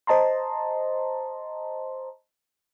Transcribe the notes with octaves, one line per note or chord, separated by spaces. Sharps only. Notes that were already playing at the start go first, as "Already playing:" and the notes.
C5 D#5 A5 A#5 C6